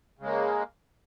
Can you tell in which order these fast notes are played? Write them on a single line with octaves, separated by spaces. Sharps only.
C#3 G#3 A#3